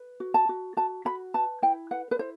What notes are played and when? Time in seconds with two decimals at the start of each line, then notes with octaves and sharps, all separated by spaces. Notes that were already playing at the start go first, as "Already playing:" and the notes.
Already playing: B4
0.20 F#4
0.34 A5
0.49 F#4
0.77 F#4 A5
1.05 F#4 B5
1.34 B4 A5
1.62 E4 G5
1.91 B4 F#5
2.11 B4
2.19 E4 C5